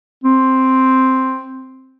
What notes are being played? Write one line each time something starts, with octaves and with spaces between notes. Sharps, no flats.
C4